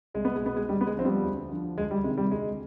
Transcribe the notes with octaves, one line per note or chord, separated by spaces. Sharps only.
C2 G#3
B3
G#3
B2 B3
G#3
D2 G3
B3
G#3
D3 F3 C4
G3 B3
D2
D3 F3
D2 G#3
G3
C3 D#3 G#3
G3
D2 G#3